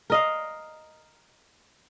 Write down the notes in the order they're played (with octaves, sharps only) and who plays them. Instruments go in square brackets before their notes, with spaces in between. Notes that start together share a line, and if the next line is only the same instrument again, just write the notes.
[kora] A#4 D#5 F5